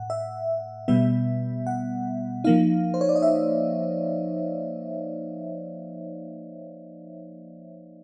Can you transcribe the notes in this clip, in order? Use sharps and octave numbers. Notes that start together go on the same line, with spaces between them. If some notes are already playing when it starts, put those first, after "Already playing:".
Already playing: A2 F#5
E5
B2 G3 B3 E5
F#5
F3 A#3 D#4 F5
C5
C#5
D5
D#5
E5